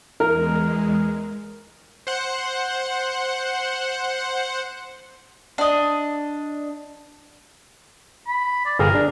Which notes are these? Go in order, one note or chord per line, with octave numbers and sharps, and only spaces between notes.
E2 G#3 A#4
C5 F#5
D4 D#5
B5
D5
G1 G#4 A#4 G5
D4